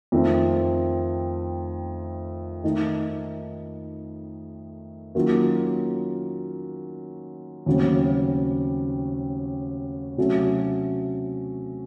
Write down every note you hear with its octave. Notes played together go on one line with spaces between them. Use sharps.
F2 D#3 A3 C4
D#3 A3 D#4
D#3 F#3 A#3 C#4 F4
D#2 C#3 F#3 A3 C4
C3 F#3 A3 C#4 F#4